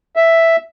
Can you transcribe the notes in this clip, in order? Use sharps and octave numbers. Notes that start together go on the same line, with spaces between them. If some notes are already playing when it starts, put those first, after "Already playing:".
E5